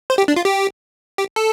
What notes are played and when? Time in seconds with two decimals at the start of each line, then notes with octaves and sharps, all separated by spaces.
0.10 C5
0.18 G4
0.28 D4
0.36 F4
0.45 G4
1.18 G4
1.36 A4